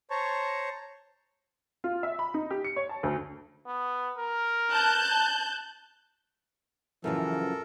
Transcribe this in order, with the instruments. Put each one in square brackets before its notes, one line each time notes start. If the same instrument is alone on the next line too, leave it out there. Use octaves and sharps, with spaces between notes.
[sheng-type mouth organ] C5 C#5 A5 A#5 C#6
[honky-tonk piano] F4
E5
B5
D#4
G4
C#7
C#5
A5
D2
[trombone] B3
A#4
[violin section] A5 F#6 G6
[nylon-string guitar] F#2 C#3 F3 [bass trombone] E3 [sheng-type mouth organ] A4 A#4